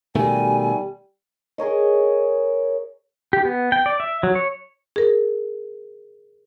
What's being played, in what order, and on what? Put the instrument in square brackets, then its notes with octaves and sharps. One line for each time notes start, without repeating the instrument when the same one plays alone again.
[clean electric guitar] B2 D#3 A3 [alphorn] G3 [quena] G#5
[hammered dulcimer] G#4 A#4 C#5 D#5
[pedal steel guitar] G4
B3
G5
D5
E5
F#3
C#5
[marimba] G#4 A#4